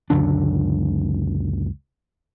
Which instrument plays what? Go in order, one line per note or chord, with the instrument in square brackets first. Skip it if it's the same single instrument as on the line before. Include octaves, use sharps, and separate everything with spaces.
[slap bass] C#2 F#2 D3 D4